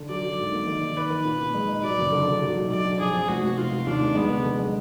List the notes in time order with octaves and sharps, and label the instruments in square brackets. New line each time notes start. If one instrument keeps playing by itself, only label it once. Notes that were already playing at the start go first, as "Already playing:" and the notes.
Already playing: [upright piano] D3
[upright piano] F#3 [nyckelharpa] D5
[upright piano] F#3
G#2
A#3
D#3
D#3
[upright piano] D#3 [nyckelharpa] B4
[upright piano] D#3
A#2
A#2
G#3
D#4
[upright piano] F#3 [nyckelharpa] D5
[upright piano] F#1
D3
D3
F#3
B1
[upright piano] B1 [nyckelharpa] D5
[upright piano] D4
[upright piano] F2 [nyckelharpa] G#4
[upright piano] F2
[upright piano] F1 [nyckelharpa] F#4
[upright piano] F1
[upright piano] F1 [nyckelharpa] F4
[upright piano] F1
[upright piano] D#2 [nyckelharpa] D4
[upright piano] F1
[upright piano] G#3 [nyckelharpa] B3
[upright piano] D3
D3
G#3